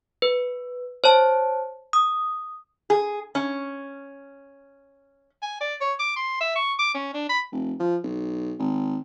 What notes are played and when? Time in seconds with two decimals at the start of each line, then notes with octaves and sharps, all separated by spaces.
0.22 B4
1.04 C5 C#5 A5
1.93 D#6
2.90 G#4
3.35 C#4
5.42 G#5
5.61 D5
5.81 C#5
5.99 D6
6.16 C6
6.41 E5
6.56 C#6
6.79 D6
6.94 C#4
7.14 D4
7.29 B5
7.52 F1
7.80 F3
8.04 B1
8.59 G#1